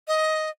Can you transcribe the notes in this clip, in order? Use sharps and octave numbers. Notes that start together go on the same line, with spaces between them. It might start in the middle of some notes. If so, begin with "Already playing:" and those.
D#5